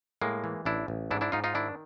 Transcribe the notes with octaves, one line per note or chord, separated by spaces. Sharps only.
A2 G#3 A#3
E3
A1 D4 E4
A1
G#2 D4 E4
D4 E4
G#2 D#4 F4
D#4 F4
D#3 D4 E4